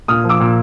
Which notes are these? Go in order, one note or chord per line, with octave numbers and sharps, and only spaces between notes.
A#2 D#6 F6
F3
D6 E6
A#2